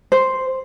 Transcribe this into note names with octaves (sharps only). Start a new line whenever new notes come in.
C5